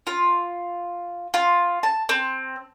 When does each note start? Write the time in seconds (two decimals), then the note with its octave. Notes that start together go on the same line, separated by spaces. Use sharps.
0.07 F4
1.34 F4
1.83 A5
2.09 C4